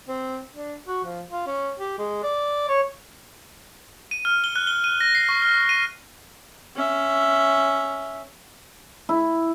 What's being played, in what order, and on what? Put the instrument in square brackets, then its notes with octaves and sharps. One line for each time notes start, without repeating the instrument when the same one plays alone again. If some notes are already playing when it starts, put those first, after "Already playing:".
[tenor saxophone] C4
D4
F#4
F3
F4
C#4
G4
G#3
D5
C#5
[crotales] D#7
F6
G7
F#6
G7
D#7
A#6
C7
C#6
F6
D#7
[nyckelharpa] C#4 E5
[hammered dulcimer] E4